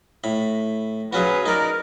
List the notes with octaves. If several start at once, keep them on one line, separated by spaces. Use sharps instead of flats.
A2 B5
F#3 C#4 F#4 G#4 B4 F5
D#4 A#4 D5